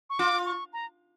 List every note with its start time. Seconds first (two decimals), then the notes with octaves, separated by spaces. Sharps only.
0.10 C#6
0.19 F4 D6
0.45 C#6
0.73 A#5